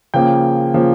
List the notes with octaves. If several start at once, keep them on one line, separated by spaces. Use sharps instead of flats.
C#3 F3 A#3 G5
C#3 F3 A#3